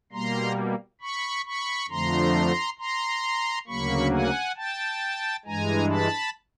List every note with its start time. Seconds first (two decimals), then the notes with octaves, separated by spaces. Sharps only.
0.12 B2 G3 A#3 A#5 C6
1.01 B5 C#6
1.46 B5 C#6
1.89 F2 D3 F3 A3 A#5 C6
2.79 A#5 C6
3.67 D2 C#3 F#3 A#3 B5 C#6
4.12 F#5 G#5
4.56 G5 A5
5.45 G2 E3 G#3 G#5 A#5
5.90 A5 B5